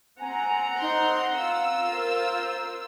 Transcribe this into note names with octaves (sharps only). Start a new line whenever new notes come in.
C4 F#5 G#5 A#5
D#4 C6
F4 F5 E6
A#4 C5